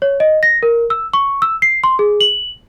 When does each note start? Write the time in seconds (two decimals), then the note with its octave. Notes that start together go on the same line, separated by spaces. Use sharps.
0.02 C#5
0.20 D#5
0.43 A#6
0.63 A#4
0.90 E6
1.14 C#6
1.42 E6
1.62 C7
1.84 C6
1.99 G#4
2.21 F#7